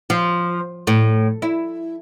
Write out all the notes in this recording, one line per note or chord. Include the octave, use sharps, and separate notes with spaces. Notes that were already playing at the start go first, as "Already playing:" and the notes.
F3
A2
E4